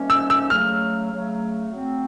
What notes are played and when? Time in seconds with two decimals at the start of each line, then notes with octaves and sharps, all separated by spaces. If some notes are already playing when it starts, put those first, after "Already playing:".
Already playing: C3 D#3 G3 A#3 C#4
0.10 E6
0.30 E6
0.50 C#3 F#3 A3 F6
1.11 C#3 F#3 A3
1.72 F#3 A3 C4